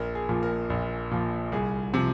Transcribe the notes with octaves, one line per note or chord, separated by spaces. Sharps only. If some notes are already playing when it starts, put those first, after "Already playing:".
Already playing: A#1 A#4
G#4
A#2 F3
A#4
A#1
A#2 F3
C2 G#4
C3 F3